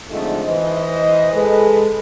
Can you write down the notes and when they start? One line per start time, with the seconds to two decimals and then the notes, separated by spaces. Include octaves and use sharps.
0.11 F2 D3 F3 G#3 A3 D#4
0.46 E3 C5 D#5
1.33 G#3 A4 B4